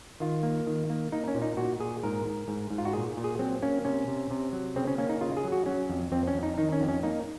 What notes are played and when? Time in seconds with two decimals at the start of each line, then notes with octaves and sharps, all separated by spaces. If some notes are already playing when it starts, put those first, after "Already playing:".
0.20 D#3 F4
0.43 A#3
0.67 D#3
0.90 A#3
1.12 A#3 D#4
1.28 C#4
1.35 A#2
1.42 D#4
1.57 A#2 F#4
1.80 A#2 G#4
2.03 G#2 A#4
2.25 G#2
2.48 G#2
2.71 G#2
2.78 F4
2.85 F#4
2.93 A#2 G#4
3.17 A#2
3.24 G#4
3.39 F#3 C4
3.62 A#3 C#4
3.85 C3 C#4
4.08 C3
4.31 C3
4.53 F#3
4.76 C#3 C4
4.87 C#4
4.98 A#3 C#4
5.09 D#4
5.21 C#3 F4
5.37 G#4
5.44 F#3
5.52 F#4
5.66 F#3 C#4
5.90 F2
6.12 F2 C4
6.27 C#4
6.35 F2
6.43 D#4
6.58 D#3 D#4
6.72 C#4
6.81 F2
6.89 C#4
7.03 A#3 D#4